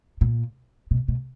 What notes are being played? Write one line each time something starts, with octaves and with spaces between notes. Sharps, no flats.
A#2
B2
B2